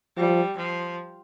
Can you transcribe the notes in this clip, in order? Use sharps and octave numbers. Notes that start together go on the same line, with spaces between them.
F3 G3
F3